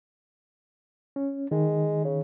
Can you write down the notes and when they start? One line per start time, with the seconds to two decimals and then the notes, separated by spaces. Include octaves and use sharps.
1.16 C#4
1.51 D#3 G#3
2.05 C#3